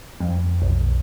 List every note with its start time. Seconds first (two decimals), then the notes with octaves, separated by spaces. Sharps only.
0.20 F2
0.62 B1